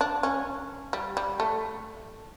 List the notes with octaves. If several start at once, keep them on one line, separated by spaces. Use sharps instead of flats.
D4
C#4
G3
G3
A3